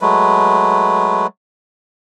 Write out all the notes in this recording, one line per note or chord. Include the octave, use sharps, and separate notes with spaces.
F#3 G#3 A3 B4